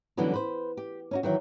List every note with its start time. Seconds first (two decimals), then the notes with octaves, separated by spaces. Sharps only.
0.17 D3 E3 F#3 G3 B3 C#4
0.34 B4 C5
0.77 G4
1.11 C#4 D#4 F#4
1.23 D#3 E3 F#3